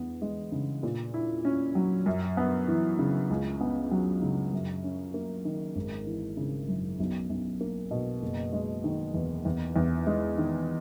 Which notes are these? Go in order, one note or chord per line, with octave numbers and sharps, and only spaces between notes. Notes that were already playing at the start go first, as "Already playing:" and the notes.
Already playing: E2 B3
G#3
C#3
A#2
E4
C#4
F#3
F#2
B3
E3
C#3
C#2
B3
F#3
C#3
F#2
C#4
A#3
D#3
G#1
E3
C#3
F#2
B1
B1
A#3
B2
F#1
G#3
D#3
E2
E2
E2
G#3
D#3